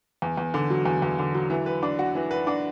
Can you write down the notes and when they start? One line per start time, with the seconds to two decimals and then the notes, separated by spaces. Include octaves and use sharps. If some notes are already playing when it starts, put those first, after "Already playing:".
0.22 E2
0.38 E2
0.54 D3
0.70 F#3
0.86 E2
1.02 E2
1.19 D3
1.35 F#3
1.50 E3
1.66 B4
1.83 D4
1.99 F#4
2.15 E3
2.31 B4
2.47 D4